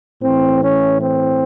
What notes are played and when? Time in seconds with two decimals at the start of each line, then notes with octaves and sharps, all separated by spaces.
0.23 A2 E3 C4
0.62 C#4
1.02 C4